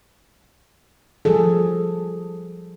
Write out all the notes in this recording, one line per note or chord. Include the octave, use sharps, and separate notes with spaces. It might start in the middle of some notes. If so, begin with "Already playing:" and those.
F3 G3 G#4 A4